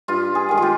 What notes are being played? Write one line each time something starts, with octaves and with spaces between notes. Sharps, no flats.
G2 F4
G#4
D#3 G#3
F4 G4